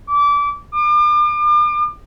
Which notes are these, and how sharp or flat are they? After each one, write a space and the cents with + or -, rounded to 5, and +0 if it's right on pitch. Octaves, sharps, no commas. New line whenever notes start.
D6 -25
D6 +40